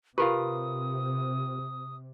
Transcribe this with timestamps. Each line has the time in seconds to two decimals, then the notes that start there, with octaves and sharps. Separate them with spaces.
0.18 C3 F4 G4 A#4 B4 D#6